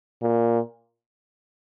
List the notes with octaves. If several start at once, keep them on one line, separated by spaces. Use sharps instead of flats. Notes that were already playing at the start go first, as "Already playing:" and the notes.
A#2